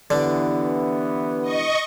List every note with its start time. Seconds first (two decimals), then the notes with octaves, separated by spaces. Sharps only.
0.10 D3 E3 B3 D4 G4
1.42 D#5 C#6